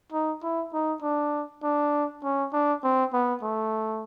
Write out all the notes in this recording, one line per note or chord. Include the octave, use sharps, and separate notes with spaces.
D#4
E4
D#4
D4
D4
C#4
D4
C4
B3
A3